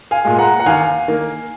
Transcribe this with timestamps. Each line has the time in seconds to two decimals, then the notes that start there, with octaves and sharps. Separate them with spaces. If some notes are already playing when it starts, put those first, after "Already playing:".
0.11 F5 G#5
0.25 A#2 G#3
0.39 F#5 A#5
0.60 F#5
0.66 D#2 F5 G#5
1.08 D#3 A#3